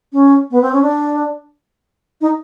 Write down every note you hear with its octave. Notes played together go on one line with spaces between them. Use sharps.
C#4
B3
C4
C#4
D4
D#4